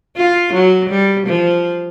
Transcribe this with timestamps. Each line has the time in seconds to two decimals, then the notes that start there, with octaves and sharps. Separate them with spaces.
0.17 F4
0.53 F#3
0.90 G3
1.27 F3